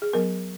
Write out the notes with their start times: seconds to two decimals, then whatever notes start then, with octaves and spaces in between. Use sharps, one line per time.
0.02 G#4
0.13 F#3 B3 A#4